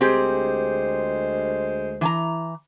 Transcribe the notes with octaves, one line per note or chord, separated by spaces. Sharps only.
D2 G#3 C4 G4 G#4 C5
E3 G#5 A#5